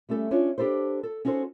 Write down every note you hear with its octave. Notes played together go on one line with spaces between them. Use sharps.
G3 A3 C#4 A4
C#4 D4 F4 C#5
D4 G4 A4 B4 C5
A4
C#4 D#4 F#4 A4 C5